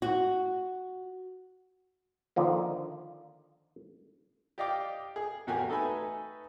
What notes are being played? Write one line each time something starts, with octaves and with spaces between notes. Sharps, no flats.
F#4
D3 D#3 F3 A#3
G4 D5 D#5 F5 G5 D6
G#4
E2 A2 F#4 G4 A#4 G#5
A3 D#4 A4 B4 G#5